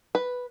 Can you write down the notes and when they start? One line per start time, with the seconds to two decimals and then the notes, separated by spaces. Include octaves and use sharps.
0.15 B4